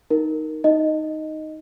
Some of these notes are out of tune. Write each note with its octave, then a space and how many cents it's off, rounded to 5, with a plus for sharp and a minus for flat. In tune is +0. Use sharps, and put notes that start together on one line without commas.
D#4 +0 A#4 +0
D#4 +0 D#5 +0